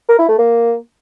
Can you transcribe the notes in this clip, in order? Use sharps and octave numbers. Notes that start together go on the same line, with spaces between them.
A#4
E4
A3
A#3